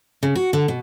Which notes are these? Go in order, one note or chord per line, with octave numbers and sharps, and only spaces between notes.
C#3
F#4
D3
B2